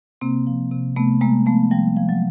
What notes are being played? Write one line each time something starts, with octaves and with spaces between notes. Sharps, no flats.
C3 A#3 C4
F3
C3
C3 A3 B3
C3 G#3 A#3
F3 A3 B3
F3 G3
F3
F#3